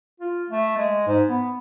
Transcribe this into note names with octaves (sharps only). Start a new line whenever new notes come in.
F4
A3
G#3
G#2
B3